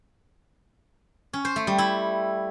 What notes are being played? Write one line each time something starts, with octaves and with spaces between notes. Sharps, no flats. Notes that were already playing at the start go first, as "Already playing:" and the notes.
C#4
C5
A3
G3
E4